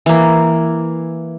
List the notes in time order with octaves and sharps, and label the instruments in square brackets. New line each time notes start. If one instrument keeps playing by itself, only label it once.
[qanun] E3 A#3